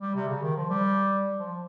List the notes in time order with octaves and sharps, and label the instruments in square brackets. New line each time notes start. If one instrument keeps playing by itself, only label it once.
[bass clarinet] G3
C3
C#3
D#3
F3
G3
F3